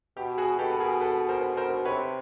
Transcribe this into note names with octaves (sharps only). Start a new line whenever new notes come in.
B2 G4
F#4 G#4
B2 G4 A4
B4
G#4 A#4
A4 B4
A#4 C5
A#4 C5
C3 B4 C#5